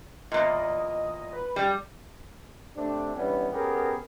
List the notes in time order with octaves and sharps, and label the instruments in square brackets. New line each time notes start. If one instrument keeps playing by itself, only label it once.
[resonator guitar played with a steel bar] E2 A#2 [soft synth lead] D#5
[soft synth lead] B4
[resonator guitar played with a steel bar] G3 [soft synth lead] G5
[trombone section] C3 A3 C4 D4
E3 G3 B3 C#4 D4
B3 C#4 G4 G#4 A#4